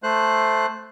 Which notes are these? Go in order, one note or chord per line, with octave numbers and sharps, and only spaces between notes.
A3 C5 F#6